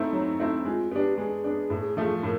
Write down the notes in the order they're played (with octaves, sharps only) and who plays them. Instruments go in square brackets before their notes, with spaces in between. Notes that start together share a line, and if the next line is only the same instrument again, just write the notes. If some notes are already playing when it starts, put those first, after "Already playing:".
Already playing: [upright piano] A3 C4 E4 [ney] D#4
[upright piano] F#3
A3 C4 E4
[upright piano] G#3 [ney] F4
[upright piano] B3 D4 [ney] G4
[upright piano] G#3 [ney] G#4
[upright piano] B3 D4
A2
F3 A3
[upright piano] A2 [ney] A#4